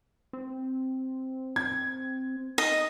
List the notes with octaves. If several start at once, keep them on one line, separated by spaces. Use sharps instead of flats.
C4
G#6
D#4 D#5